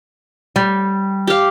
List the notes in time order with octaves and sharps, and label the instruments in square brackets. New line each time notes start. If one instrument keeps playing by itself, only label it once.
[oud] G3
[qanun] G4 F5